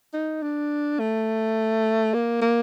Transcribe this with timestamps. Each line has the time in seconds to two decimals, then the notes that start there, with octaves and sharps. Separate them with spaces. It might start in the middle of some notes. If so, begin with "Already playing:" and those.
0.14 D#4
0.43 D4
1.00 A3
2.14 A#3
2.42 A#3